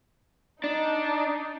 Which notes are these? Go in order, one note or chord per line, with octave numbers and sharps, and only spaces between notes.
D4 D#4